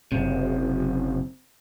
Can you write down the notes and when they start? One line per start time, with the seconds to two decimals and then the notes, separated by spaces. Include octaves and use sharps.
0.12 F#1 C3